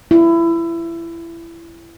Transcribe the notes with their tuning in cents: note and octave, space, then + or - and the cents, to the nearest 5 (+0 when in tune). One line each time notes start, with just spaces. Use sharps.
E4 +20